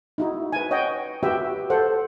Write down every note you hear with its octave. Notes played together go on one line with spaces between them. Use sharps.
D#4 E4 F#4
B4 G#5
C#5 D#5 F#5 G5
F#4 G4 B4 E5 G5
A4 C5 F#5